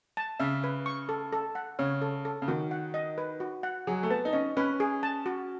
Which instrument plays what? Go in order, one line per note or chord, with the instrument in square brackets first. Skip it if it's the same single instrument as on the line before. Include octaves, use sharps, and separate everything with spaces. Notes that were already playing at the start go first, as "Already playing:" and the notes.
[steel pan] A5
[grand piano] C#3 [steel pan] E5
[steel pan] B4
C#6
A4
A4
F#5
[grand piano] C#3 [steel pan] C#5
[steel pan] A4
A4
[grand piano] C#3
[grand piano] D#3 [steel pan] F#4
[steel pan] F#5
D#5
B4
F#4
F#5
[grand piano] F#3 [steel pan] G#4
[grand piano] A3
[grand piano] B3 [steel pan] A5
[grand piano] D#4
[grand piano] C#4 [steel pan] D#5
[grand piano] C#4 [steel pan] B4
[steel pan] G#4
A5
F#4